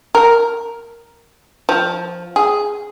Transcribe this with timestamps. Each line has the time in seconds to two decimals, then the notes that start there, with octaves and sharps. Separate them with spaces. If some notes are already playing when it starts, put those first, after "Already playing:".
0.15 A#4
1.69 F3
2.36 G#4